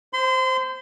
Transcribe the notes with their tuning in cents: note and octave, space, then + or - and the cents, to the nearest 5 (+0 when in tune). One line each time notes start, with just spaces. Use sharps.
C5 +0 C6 -30